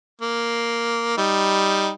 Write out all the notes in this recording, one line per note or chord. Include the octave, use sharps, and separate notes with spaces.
A#3
G3 D#4